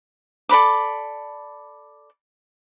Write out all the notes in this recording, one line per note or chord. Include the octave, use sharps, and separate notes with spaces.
A4 D5 B5 D6